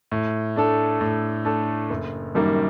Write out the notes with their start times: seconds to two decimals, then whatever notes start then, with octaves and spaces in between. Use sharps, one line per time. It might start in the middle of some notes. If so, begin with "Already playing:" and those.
0.12 A2
0.56 A3 D4 A4
1.01 A2
1.45 A3 D4 A4
1.90 F#1
2.35 F#2 D#3 G3 A#3